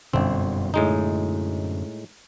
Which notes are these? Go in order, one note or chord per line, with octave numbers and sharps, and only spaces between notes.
G1 F#2 B2 D3 C4
A2 G#3 D#4